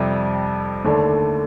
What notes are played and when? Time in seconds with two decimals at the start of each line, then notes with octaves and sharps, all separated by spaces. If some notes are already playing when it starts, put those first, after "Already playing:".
Already playing: F2 C3 G3
0.84 D#2 D3 A3 D4